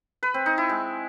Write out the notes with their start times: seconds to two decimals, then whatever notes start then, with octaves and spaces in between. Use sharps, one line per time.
0.23 B4
0.34 C4
0.46 D#4
0.58 E4
0.69 G#3